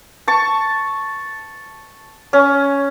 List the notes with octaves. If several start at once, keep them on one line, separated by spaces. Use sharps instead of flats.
A5 C#6
C#4